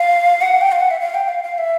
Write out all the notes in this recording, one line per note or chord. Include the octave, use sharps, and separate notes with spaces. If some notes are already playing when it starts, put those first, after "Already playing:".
Already playing: F5
F#5
G5
F5
F#5
E5
F5
G5
F5
F5
E5